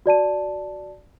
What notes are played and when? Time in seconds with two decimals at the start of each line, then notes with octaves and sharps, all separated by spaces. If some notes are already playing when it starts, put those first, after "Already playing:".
0.06 F#4 D5 A5 D#7